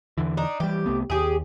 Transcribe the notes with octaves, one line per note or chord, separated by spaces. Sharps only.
E2 D3 E3
D4 D#4
E3 G3 G4
C2 A3 B3
D#2 G4 G#4